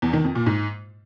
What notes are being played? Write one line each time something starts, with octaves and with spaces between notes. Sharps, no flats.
E2
D#3
F2
A#2
G#2